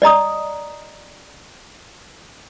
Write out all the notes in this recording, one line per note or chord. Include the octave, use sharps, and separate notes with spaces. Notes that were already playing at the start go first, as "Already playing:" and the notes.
D5 D#5 A#5 D#6